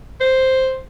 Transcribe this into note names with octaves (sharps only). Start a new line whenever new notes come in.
C5